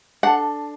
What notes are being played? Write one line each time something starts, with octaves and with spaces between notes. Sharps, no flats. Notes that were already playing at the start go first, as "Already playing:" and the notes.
D4 A4 F#5